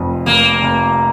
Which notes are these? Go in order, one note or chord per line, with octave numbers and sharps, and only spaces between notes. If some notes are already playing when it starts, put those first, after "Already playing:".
Already playing: F1 F2
F1 A#3
F1